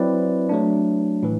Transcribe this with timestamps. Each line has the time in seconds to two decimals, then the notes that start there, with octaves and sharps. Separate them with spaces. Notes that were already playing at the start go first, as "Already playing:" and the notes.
Already playing: F#3 C4 E4 B4 D5
0.49 F#3 A3 D4
1.23 A2 E3